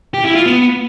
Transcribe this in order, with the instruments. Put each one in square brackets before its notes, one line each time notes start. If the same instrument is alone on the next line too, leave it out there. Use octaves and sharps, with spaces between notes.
[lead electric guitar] G4
E4
F4
B3